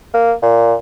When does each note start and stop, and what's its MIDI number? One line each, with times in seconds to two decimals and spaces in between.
0.14 0.33 58
0.43 0.75 46